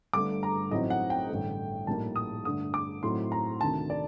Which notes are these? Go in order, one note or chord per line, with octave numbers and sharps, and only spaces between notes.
G1 G2 D3 A3 D4 D6
A#5
A1 A2 F#3 C4 D#4 D#5
F#5
G5
A1 G2 D3 A3
A#1 A2 G3 A#3 D#4 A5
D#6
G2 D3 A3 D4 D#6
D6
A2 F#3 A3 C4 D#4 C6
A#5
D2 C3 D#3 A3 D4 A5
D5